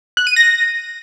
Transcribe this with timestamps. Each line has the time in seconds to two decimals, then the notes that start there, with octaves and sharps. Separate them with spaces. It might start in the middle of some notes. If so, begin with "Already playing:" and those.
0.17 F#6
0.27 D#7
0.36 A#6